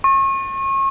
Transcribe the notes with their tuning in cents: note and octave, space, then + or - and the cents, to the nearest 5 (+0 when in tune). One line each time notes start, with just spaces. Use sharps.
C#6 -35